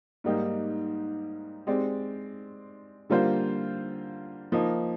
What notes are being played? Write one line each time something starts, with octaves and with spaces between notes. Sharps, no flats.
G#2 G3 A#3 D#4 G4
G#3 C4 G4 D5
D3 G3 A#3 F4 C5
F3 A#3 D#4